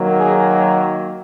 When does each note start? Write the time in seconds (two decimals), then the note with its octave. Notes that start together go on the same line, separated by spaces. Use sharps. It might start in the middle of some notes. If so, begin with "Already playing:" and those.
Already playing: D#3 F#3 A#3
0.18 G#4